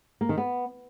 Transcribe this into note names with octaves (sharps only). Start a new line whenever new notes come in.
A#3
D#3
B3